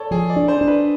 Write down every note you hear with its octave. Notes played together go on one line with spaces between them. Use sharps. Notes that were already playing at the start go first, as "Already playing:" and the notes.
Already playing: A4 C#5 D5
F3 G#4
D5
D4
C5
D4
B4